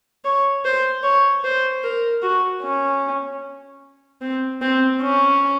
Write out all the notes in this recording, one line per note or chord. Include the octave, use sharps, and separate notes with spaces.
C#5
C5
C#5
C5
A#4
F#4
C#4
C4
C4
C#4